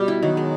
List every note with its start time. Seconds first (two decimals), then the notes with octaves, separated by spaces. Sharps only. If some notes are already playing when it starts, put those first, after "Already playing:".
Already playing: B2 G3 B3
0.08 E4
0.22 D#3 F#3
0.37 G#3